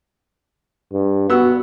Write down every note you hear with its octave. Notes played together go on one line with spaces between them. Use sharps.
G2
B3 F#4 E6